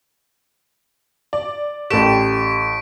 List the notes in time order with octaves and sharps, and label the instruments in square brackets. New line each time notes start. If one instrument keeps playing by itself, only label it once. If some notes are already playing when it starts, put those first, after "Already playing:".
[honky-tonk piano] D5
[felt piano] A1 A4 E7 [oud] G4 [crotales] C#6 B6 D7